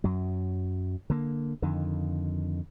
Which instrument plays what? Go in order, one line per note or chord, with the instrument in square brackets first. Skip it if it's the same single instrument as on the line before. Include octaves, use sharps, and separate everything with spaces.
[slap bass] F#2 F#3
D3 A#3
F2 D3 D#3